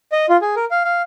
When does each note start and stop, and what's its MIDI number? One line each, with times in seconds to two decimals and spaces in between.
0.12 0.26 75
0.29 0.37 65
0.42 0.55 68
0.56 0.65 70
0.71 0.83 77
0.84 1.02 77